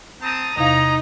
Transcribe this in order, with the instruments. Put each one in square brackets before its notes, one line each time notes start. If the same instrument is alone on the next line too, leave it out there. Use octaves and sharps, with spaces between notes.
[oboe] C4 [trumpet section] A5 A#5 D#6
[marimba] E2 C3 F5 [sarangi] D#4 [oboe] D#5 [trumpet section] G#5 A#5